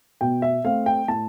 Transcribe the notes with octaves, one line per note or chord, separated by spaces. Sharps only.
B2 G5
E5
A3 C4 F5
G5
A2 A5